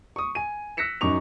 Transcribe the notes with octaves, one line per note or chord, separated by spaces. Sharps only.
C#6 D#6
G#5 D#7
E6 F#6 A#6 B6 C#7 E7
F#2 D#4 F#4 C#6 D6 F7